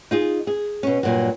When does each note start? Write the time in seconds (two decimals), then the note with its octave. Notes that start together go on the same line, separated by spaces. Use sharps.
0.11 D#4 F4 G#4
0.47 G#4
0.83 B2 C#4
1.03 G2 A#2 F#3